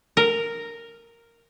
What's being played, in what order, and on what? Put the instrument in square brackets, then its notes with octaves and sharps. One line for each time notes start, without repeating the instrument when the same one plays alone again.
[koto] A#4